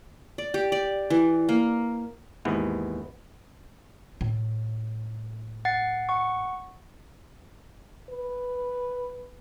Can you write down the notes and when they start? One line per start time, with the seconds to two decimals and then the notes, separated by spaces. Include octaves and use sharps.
0.38 D5
0.54 G4
0.72 D5
1.10 E3
1.49 A#3
2.45 D#2 G#2 E3 B3
4.21 A2
5.65 F#5 A6 C7
6.09 F#5 C#6
8.10 B4